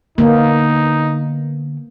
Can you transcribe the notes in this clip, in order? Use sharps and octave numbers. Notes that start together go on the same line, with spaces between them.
D3 A#3 B3 D#4